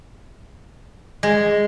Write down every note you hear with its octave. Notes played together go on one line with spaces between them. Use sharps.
G#3